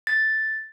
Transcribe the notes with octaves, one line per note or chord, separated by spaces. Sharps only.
A6